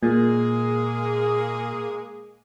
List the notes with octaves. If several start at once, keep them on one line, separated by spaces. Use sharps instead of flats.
A#2 G#3 A#3 G#4